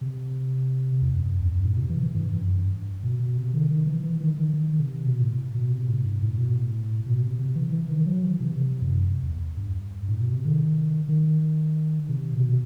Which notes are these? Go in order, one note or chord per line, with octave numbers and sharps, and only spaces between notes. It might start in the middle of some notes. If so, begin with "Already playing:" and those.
C3
E2
F#2
F#2
E2
F#2
A2
C3
E3
E3
G2
F#2
G2
F#2
G2
B2
B2
C3
D#3
D#3
E3
E3
D#3
D#3
D#3
C3
B2
A2
B2
C3
A2
G2
A2
B2
A2
B2
C3
C3
E3
E3
D#3
F#3
E3
C3
C3
F#2
E2
G2
A2
B2
C3
D#3
D#3
C3
B2